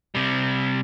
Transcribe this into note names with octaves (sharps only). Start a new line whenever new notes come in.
C3 G3